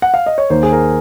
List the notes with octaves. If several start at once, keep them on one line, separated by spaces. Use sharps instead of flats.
F#5
F5
D#5
C#5
D#2 D#3 A#3 C5
G#4
A#4